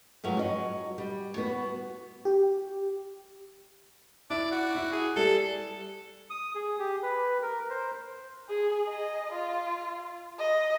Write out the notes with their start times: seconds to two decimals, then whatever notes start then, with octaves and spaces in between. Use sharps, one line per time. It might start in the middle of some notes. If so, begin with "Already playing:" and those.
0.24 G2 F3 F#3 G#3
0.37 F#4 D#5
0.98 G3
1.37 B3 F#4
2.25 G4
4.30 E4 D5
4.51 F#4
4.75 E4
4.92 G#4
5.16 G3 A4
6.30 D#6
6.55 G#4
6.79 G4
7.03 B4
7.42 A#4
7.70 C5
8.49 G#4
8.88 D#5
9.33 F4
10.39 D#5